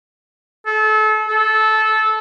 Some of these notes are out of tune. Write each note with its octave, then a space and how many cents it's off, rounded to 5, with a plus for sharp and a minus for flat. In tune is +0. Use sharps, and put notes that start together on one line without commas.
A4 -30
A4 -15